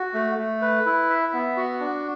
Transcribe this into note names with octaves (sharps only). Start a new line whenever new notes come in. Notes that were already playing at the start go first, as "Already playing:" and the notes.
Already playing: F#4
A3
A3
B4
E4
E5
B3
F#4
D4